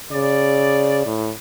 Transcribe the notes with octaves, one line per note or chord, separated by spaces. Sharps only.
C#3 D5
A2